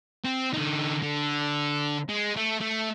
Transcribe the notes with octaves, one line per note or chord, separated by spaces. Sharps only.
C4
D3 D#4
D3
G#3
A3
A3